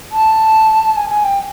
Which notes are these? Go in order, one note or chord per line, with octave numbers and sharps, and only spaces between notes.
A5
G#5
G#5
G5